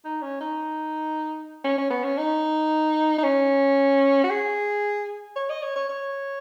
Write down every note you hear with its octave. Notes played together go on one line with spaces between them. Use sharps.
D#4
C#4
D#4
C#4
C#4
B3
C#4
D#4
D#4
C#4
F#4
G#4
C#5
D#5
C#5
C#5
C#5